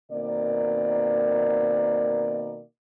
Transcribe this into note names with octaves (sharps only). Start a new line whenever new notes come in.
B2 D#3 A#3 C4 D5